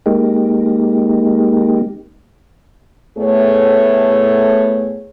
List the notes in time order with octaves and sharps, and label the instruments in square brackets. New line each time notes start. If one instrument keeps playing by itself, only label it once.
[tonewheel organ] G#3 A#3 D#4 G4
[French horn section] A2 A3 B3 G#4 C#5